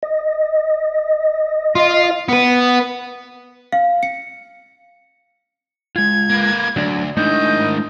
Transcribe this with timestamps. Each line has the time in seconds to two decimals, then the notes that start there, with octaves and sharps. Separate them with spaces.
0.03 D#5
1.75 F4
2.29 B3 B4
3.72 F5
4.03 C#7
5.96 G#3 F4 G#6
6.30 A#3 B4
6.76 D2 F#3 D4 D5
7.17 G#2 D#3 A3 D4 E4 D#5 G6